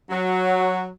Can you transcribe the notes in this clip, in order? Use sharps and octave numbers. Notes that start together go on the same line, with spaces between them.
F#3